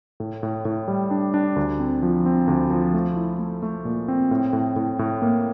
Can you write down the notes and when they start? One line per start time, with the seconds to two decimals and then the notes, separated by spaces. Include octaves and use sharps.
0.20 A2
0.43 A2
0.65 A2
0.88 G3
1.11 D4
1.34 D4
1.56 D2
1.80 C4
2.02 F3
2.26 C4
2.47 D2
2.70 F3
2.93 A3
3.17 E4
3.39 A3
3.63 A3
3.85 A#2
4.08 C4
4.31 A2
4.53 A2
4.76 A2
4.99 A2
5.22 A#3